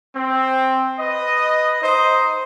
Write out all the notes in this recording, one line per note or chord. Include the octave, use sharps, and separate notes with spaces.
C4
B4 D#5
D#4 C5 D#5